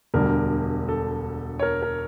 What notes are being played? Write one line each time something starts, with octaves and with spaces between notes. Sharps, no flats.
E1 D2 D3 G3 A#4
A4
C#5
A#4
A#4